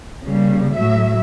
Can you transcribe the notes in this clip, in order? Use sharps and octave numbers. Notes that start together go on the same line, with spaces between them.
C#3 G3 A#3
A2 F#3 E5